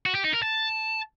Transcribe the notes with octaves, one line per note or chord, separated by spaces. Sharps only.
F#4
G4
D#4
A#4
A5